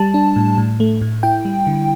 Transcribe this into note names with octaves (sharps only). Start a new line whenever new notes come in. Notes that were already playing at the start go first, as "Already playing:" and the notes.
Already playing: G3 A5
D4
A2
A2
A3
A2
E4 G5
G3
D3